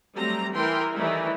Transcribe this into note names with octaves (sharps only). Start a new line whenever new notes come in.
F#3 G3 A3 C4 A#5
E3 A#4 G5 C6
D#3 E3 G3 A3 D#4 E4